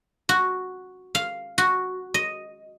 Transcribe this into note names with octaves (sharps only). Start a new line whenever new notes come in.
F#4
F5
F#4
D#5